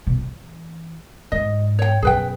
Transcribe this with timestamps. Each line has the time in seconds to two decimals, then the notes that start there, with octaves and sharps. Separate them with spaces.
0.07 B2
0.18 E3
1.32 G#2 D#5
1.79 C#5 G5
2.02 F#2 B2 G#4 B4 G5